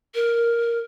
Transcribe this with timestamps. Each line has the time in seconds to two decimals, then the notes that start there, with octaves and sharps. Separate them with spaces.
0.15 A#4